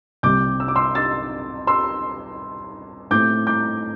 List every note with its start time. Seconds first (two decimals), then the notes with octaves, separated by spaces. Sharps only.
0.23 C2 C3 G3 C4 D6 G6
0.60 E6
0.68 D6
0.76 C6 E6
0.95 E6 A6
1.67 C6 E6
3.11 A2 A3 C4 D6 G6
3.47 D6 G6